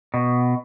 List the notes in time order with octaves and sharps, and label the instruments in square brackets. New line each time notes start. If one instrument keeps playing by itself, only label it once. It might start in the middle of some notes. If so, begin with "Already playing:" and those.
[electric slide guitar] B2